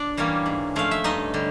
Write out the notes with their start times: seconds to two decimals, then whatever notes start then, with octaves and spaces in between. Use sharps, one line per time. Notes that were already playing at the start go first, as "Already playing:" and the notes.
Already playing: D4 D5
0.17 E3 G3 A#3 C#4
0.46 G#2
0.76 F3 A3 C#4 F5
0.91 E5
1.04 G2 D#4 D#5
1.34 D3 G3